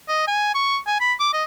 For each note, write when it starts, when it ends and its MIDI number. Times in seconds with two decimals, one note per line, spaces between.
0.08 0.23 75
0.27 0.52 80
0.54 0.77 85
0.86 0.99 80
1.00 1.14 83
1.20 1.29 86
1.33 1.44 75